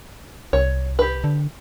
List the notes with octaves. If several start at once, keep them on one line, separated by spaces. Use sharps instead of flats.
C2 C#5
G4 B4
D3